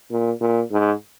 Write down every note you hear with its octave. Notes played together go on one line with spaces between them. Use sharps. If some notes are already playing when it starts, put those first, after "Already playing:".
A#2
A#2
G#2